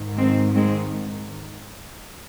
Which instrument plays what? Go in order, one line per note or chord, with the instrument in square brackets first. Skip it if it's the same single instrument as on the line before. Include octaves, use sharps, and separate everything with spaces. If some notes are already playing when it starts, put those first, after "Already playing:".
Already playing: [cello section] G#2 D#3
G#3 C4
G#3 C4